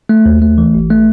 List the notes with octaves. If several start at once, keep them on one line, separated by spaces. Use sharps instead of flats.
A3
D#2
A3
E3
G#1
A3